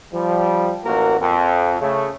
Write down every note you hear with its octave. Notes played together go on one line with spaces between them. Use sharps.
F3 G3
A1 A#3 F#4 A#4
F2
C#3 A3